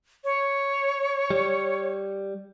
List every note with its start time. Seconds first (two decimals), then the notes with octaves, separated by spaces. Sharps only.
0.24 C#5
1.31 G3